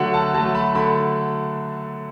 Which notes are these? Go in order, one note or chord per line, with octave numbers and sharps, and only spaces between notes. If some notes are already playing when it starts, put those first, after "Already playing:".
Already playing: D3 F#3 A3 F#5
A5
F#3 A3 A5
B5
D3 B5